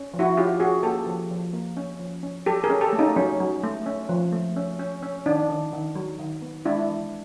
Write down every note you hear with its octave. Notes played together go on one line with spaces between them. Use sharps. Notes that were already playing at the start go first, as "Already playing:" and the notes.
Already playing: C#4
F3
E4 F#4
C#4 F4 G4
C#4 F#4 G#4
A#3 G4 A4
F3
F3
A#3
C#4
F3
C#4
F#3 G4 A4
G#4 A#4
C#4
G4 A4
A3
C#4 D#4
F#3 C#4
F#3
A3
C#4
F3
A3
C#4
C#4
C#4
D#3 D4
D#3
D#3
F#3
D#3
B3
G#3 D4 E4
E3